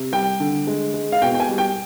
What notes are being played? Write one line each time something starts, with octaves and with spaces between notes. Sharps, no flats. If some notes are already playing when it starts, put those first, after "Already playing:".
Already playing: C3
G3 G5
D3
G#3
G#3
F5
B2 G5
G5
G#5
G3
G5